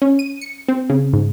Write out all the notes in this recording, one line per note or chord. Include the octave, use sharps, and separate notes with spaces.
C#4
D#7
C#7
C4
C#3
G#2